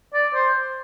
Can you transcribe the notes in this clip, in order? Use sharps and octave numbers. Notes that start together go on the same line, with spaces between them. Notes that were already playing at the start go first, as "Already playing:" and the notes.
D5
C5